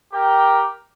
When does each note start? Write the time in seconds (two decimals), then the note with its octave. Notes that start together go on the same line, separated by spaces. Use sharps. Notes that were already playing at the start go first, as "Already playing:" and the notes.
0.13 G4 A#4 G5